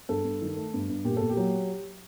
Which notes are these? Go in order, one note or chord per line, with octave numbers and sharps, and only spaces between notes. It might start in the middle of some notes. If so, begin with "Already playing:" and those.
G2 A4
G2
D#3
A3
G2
G2
A#2 G4
A#2 A4
G4
F#3